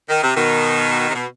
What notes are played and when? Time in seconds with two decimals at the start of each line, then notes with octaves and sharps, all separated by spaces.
0.10 D#3
0.23 C3
0.36 B2 D#3
1.09 C3
1.14 B2